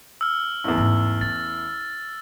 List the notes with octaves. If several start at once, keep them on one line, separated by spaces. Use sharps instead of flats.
E6 F6
A1 E2
G#2
E4 A6